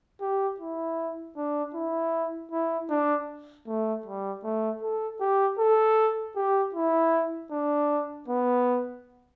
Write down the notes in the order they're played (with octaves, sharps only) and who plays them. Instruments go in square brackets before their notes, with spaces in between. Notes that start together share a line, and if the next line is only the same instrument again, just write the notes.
[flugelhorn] G4
E4
D4
E4
E4
D4
A3
G3
A3
A4
G4
A4
G4
E4
D4
B3